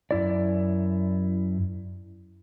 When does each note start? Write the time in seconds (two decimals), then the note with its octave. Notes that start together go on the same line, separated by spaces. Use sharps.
0.11 F#2 E4 D5